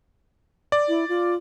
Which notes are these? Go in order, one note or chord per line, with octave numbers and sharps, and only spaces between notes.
D5
E4
F4